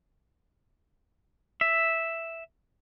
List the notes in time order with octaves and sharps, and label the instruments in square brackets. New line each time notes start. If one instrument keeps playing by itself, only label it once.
[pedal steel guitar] E5